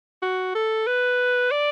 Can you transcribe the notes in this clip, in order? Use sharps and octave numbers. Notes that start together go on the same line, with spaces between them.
F#4
A4
B4
D5